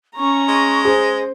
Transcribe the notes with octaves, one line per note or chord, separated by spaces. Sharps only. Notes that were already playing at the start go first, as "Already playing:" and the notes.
C#4 A#5 C#6
G#3
G#4 C5